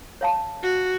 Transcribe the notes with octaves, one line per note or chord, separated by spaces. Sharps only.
C#5 F5 A5
F#4